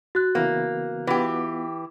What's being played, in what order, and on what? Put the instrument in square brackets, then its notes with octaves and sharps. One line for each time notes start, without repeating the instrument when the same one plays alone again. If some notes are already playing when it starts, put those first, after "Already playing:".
[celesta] F#4 F#6 [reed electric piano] A6
[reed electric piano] C#3 E3 B3 [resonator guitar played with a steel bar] A#3
[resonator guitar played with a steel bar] E3 G4 [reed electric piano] B3 F4